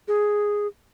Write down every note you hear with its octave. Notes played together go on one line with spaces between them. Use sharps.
G#4